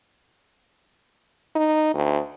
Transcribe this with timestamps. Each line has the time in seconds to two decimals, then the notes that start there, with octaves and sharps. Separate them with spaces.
1.55 D#4
1.94 D2